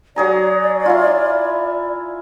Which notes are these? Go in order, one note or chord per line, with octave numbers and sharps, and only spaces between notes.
F#3 G#4 D5 A#5
E4 F4